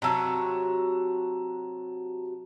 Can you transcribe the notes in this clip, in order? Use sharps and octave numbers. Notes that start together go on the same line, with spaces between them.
C3 F#3 F#4 A5 A#5 E6